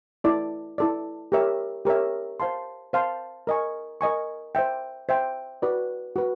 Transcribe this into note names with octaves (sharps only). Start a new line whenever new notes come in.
E4 A4 D5
E4 A4 D5
G4 A#4 C#5 E5
G4 A#4 C#5 E5
C5 F5 A5 C6
C5 F5 A5 C6
A#4 D#5 G#5 C#6
A#4 D#5 G#5 C#6
C5 E5 G5
C5 E5 G5
F#4 B4 D5
F#4 B4